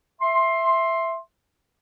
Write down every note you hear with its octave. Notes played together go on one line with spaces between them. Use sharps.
E5 C6